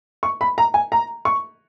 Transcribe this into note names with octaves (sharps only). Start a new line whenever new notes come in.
C#6
B5
A#5
G#5
A#5
C#6